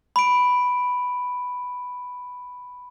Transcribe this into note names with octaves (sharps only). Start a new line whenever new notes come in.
B5 D7